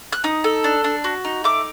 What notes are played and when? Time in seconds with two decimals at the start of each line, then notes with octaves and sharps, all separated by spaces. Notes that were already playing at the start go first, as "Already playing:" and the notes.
0.12 F#6
0.24 D#4 D#6
0.44 A4
0.64 D4
0.84 D4
1.04 F#4
1.25 D#4
1.44 A3 D6